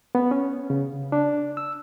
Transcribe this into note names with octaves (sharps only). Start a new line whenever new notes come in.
B3
C#4
C#3
D4
E6